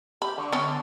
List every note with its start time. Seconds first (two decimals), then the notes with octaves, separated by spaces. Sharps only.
0.22 G4 B5
0.38 D3 C#6
0.52 B3 C#4
0.67 A5